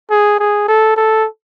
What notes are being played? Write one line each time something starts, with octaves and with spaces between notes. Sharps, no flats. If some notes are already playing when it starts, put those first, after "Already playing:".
G#4
G#4
A4
A4